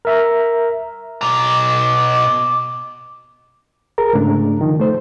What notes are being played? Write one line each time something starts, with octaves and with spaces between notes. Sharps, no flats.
A#4 E5 A#5
B2 A#5 D6
G#4 A#4 A#5
G#2 C#3 A3 D4
D#3 F3
A3 C5